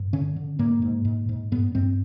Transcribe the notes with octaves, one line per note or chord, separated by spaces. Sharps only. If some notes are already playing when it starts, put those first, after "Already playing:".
Already playing: G2
D3 C#4
D3
G#2 A#3
G#2
G#2
G#2
G2 B3
G2 C4